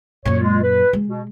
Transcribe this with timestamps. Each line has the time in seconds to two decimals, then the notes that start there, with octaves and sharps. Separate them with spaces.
0.26 F#2 A#2 C#5
0.40 G#3 F4
0.62 B4
0.93 G#3
1.07 B2